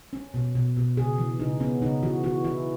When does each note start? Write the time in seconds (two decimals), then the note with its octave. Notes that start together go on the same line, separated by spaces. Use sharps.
0.13 C#4
0.34 B2
0.55 B2
0.77 B2
0.97 C#3 G#4
1.18 E3
1.40 C#3 D#4
1.60 B3 C#4
1.82 C#3 D#4
2.03 E3 F#4
2.24 E3 F#4
2.44 E3 E4